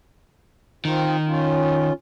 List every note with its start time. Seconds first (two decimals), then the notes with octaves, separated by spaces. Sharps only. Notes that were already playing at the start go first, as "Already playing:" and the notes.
0.85 D#3 C4 F4
1.26 C#4 F4